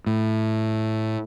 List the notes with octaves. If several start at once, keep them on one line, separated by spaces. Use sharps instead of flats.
A2